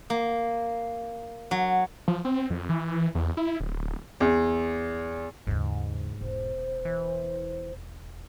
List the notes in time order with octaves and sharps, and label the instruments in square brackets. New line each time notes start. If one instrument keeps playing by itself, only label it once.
[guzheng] A#3
F#3
[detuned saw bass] F3
C4
F2
E3
E2
E4
D1
[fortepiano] E2
[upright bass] D#2 C#3 [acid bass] G#2
[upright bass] E1 [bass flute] C5
[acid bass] E3